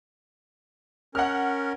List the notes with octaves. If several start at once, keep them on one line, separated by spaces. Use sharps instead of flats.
C#4 A#4 F#5 F6